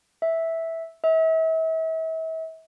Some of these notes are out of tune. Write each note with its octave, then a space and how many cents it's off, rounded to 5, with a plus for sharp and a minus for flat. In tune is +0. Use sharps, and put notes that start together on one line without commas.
E5 -10
E5 -40